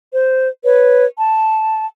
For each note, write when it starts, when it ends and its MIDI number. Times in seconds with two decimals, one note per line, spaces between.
0.14 0.48 72
0.64 1.05 71
0.64 1.05 73
1.18 1.85 81